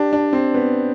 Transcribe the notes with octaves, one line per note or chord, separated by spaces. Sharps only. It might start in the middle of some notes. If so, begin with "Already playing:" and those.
Already playing: D4 G4
D4
C4
B3